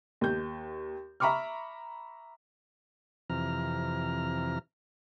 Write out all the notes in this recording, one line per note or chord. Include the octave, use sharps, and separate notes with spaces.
D#2 G6
E5 A#5 B5 C#6 D6 F6
F2 C3 E3 A#5 F6